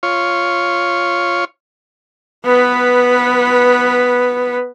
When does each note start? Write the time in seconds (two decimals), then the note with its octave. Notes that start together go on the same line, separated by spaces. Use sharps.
0.03 F4 C#5
2.45 B3 B4